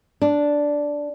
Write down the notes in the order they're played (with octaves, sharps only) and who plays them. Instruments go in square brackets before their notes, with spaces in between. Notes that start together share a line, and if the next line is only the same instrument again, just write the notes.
[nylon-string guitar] D4